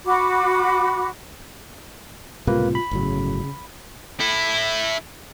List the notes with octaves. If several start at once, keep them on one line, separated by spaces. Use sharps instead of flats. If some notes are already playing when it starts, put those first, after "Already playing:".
F#4 B5 D6
C#2 A2 C3 G3 A#3 F4 B4
B5
G1 A2 C#3 F#3
E4 A4